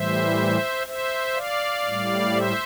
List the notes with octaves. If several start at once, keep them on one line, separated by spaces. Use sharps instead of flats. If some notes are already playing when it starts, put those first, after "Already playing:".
Already playing: A2 E3 G3 C5 E5
C5 E5
D5 F5
A2 G3
C5 E5